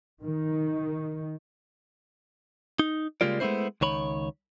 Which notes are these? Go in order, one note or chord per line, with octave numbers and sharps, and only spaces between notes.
D#3
D#4
C#3 G3 G#3 A#3 F4 D5
G#3 A3 B3 C#4 E4 C5
C#2 D#3 C#5 B5